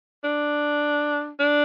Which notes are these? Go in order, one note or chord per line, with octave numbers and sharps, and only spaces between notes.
D4
D4